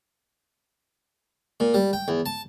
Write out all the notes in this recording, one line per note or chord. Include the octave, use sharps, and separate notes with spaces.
A#2
G3
G5
E2
A5